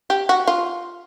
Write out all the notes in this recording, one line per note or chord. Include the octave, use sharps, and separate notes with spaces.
G4
F#4
F4